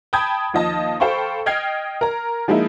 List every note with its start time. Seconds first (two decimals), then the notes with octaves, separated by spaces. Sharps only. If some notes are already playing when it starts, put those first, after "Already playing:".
0.13 G5 A5 B5 D#6 G6 G#6
0.53 D#2 F3 F4 D#5 A5
1.00 A4 C5 F5 G5 B5 C#6
1.46 D#5 G5 F6 G#6 C7
2.01 A#4 A#5
2.48 F3 G#3 A#3 D#4 E4